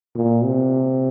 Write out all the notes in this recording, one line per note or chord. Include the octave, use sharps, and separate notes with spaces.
A#2
C3